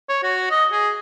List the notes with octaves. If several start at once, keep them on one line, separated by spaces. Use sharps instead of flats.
C#5
F#4
D#5
G#4